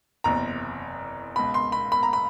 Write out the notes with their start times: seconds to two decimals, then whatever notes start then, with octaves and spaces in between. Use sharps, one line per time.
0.24 F#1 E2 C3 A#5
1.36 C#2 B2 B5
1.54 C6
1.72 B5
1.92 B5
2.03 A#5
2.13 B5